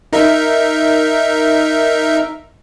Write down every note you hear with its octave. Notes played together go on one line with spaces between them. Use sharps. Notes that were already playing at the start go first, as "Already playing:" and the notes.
D#4 A#4 E5